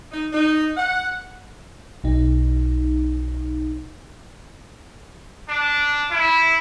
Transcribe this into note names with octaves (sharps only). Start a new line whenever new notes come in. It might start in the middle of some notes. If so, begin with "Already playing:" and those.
D#4
D#4
F#5
B1 D#4
D4
E4